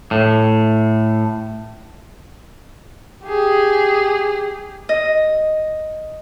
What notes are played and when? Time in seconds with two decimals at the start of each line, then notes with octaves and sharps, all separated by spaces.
0.11 A2
3.26 G4 G#4
4.89 D#5